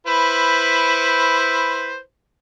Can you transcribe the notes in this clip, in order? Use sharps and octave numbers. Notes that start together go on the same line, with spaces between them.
E4 B4 C5